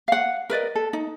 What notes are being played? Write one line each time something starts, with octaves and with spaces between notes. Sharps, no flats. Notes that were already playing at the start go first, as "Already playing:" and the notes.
F5 F#5
A#4 B4 D5 D#5
A4
D#4